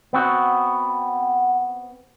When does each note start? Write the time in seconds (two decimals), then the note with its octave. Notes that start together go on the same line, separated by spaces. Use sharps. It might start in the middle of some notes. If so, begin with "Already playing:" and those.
0.13 B3 C4 F#4